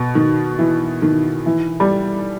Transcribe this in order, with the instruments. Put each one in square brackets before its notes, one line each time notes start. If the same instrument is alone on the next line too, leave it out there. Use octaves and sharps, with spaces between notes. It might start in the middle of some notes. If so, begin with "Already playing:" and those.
Already playing: [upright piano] B2
D#3
E3
D#3
E3
G3